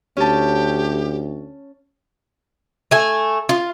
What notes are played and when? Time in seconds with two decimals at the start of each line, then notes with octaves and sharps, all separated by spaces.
0.17 D2 C#4 G4 A5
2.91 A3 G#5
3.49 F4